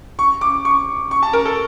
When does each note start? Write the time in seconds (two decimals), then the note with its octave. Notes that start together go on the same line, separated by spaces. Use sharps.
0.19 C#6
0.41 D6
0.65 C#6
1.11 C#6
1.23 A5
1.33 A#4
1.45 A4